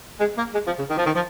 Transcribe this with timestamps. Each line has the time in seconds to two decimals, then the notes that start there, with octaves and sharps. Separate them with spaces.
0.19 G#3
0.36 A#3
0.53 G#3
0.65 F3
0.77 C#3
0.88 D#3
0.97 F3
1.05 D#3
1.14 F3